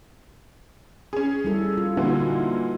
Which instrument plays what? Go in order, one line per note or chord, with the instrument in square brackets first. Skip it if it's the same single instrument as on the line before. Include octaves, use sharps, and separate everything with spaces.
[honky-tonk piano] C#4 G#4
[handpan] G3 E4 A4
F4
[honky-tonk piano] A#2 D3 E3 [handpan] F#4
[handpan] D#4